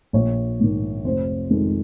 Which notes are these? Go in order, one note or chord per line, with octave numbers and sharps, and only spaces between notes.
A#1 C#5
G#2 D#3
F1 C5
F2 D#3 G#3